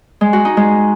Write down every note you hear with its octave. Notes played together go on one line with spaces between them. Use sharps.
G#3
F#4
D#4
G#3